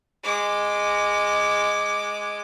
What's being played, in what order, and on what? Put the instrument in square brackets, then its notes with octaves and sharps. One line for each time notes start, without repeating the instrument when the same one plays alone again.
[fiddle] G#3 D6